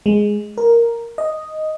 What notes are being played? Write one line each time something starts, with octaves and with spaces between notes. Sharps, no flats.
G#3
A#4
D#5